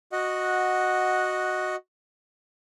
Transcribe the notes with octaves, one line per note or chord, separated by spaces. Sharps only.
F#4 D#5 F#5